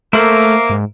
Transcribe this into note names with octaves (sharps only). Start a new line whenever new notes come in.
A3 A#3 A#4 C5 E5
G#2